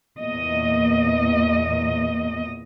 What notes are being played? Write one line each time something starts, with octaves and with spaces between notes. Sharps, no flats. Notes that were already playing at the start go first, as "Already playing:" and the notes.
E2 A#2 A#3 D#5